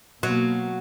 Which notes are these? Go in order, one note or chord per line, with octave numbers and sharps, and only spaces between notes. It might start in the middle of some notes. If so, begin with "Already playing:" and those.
B2 F#3 A#3